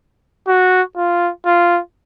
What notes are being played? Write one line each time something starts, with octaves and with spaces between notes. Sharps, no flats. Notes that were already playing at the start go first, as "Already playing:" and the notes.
F#4
F4
F4